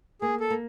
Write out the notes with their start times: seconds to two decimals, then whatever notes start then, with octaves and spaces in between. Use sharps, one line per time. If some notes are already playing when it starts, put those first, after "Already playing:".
0.21 A#3 G#4
0.40 A4
0.50 A#3